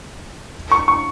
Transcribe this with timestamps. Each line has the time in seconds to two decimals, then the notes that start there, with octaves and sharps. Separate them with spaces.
0.72 C#6
0.88 C#6